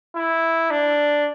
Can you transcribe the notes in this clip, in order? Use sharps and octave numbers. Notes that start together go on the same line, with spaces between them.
E4
D4